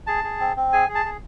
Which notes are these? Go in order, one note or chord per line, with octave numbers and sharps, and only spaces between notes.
G#4 A5
G#4
C4
C4
G#4 G#5
G#4
A5
G#4